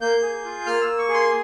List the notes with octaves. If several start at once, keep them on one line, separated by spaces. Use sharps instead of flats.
A#3 G6
G#4
F4
A#3 F6
E6
A#3
C#6
G#4
C6